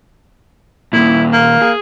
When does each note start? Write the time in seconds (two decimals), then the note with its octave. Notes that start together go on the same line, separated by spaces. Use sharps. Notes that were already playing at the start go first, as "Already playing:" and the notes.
0.93 D#2 A#2 E4
1.33 A#3
1.62 G#4